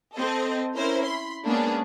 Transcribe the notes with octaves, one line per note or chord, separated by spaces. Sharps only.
C4 A4 D#5
C#4 E4 A#4 C5
B5 C6
G#3 A#3 B3 C#4 D4 G#4